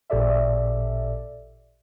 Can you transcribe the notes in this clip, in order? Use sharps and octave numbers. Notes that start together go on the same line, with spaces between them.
A1 A#2 G4 A4 D5 E5